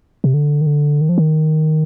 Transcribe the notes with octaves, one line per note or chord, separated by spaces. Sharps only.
C3
D3
D#3
D3
D#3
F3
D#3